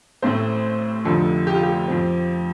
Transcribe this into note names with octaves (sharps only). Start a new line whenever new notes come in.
A1 A2 A3 C4 C5
F1 F2 D3 F3 A4
G4
F4
G4
F2 F3 C4